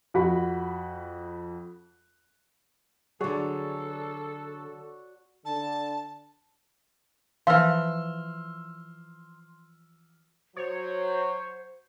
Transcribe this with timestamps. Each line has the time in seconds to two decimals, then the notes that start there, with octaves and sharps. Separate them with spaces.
0.14 F2 F#4 B5
3.21 D3 F#3 F#4 G#4 A4 C#5 D5
5.45 D3 A5
7.47 E3 F3 F5 C6 E6 F6
10.56 F#3 C5 C#5